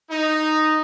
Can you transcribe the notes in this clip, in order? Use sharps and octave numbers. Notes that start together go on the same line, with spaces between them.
D#4